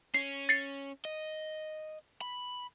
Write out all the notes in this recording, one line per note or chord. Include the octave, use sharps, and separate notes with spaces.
C#4 C7
A6 C7 C#7
D#5
B5